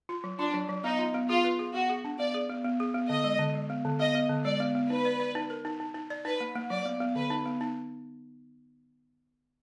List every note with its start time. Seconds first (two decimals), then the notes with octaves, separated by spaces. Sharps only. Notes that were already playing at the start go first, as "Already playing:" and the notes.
0.09 F4
0.24 F#3
0.39 D4 F4
0.54 F#3
0.69 F#3
0.84 B3 D#4
0.99 F4
1.14 B3
1.29 F4 G#4
1.44 B4
1.59 G#4
1.74 B3 F#4
1.90 G#4
2.05 D4
2.19 B3 D5
2.34 G#4
2.49 B3
2.64 B3
2.80 G#4
2.95 B3
3.10 D3 D#5
3.24 G#3
3.39 D3
3.55 G#3
3.70 B3
3.85 D3
4.00 B3 D#5
4.15 B3
4.29 D3
4.45 G#3 D5
4.60 B3
4.75 B3
4.90 D#4 B4
5.05 D5
5.20 D5
5.35 D#4
5.50 A#4
5.65 D#4
5.80 D#4
5.95 D#4
6.10 D5
6.25 D#4 B4
6.40 A#3
6.56 A#3
6.70 F#3 D5
6.85 B3
7.00 B3
7.15 D3 B4
7.30 D#4
7.45 B3
7.61 D#4